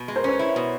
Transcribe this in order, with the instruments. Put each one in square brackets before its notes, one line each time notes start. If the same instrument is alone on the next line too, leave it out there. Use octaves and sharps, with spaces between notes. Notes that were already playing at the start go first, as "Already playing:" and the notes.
Already playing: [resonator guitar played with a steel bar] B2
G#3
[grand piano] A#4 C5
[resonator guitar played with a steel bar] C#4 [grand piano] B4 C#5
[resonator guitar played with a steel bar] E4
B2